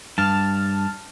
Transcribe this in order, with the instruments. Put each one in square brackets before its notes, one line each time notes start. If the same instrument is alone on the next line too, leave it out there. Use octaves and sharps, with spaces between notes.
[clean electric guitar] G2 [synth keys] A5 F6